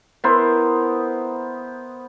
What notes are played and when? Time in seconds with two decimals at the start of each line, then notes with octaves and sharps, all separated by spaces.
0.24 B3 E4 A#4 C5